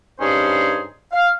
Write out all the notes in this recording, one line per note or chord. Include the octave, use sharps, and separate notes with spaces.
G2 C#4 D#4 G#4 C5
F5